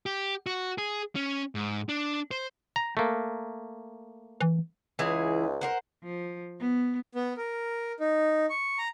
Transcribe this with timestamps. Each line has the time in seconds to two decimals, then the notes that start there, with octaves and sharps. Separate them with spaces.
0.06 G4
0.47 F#4
0.78 G#4
1.15 C#4
1.55 G#2
1.89 D4
2.31 C5
2.76 A#5
2.97 A3 A#3
4.41 E3
4.99 C#2 E3 E4 G#4
5.61 A#4 C5 F#5
6.03 F3
6.60 B3
7.15 B3
7.37 A#4
8.00 D#4
8.50 C#6
8.78 A#5